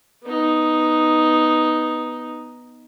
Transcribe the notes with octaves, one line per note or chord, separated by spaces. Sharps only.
B3 D#4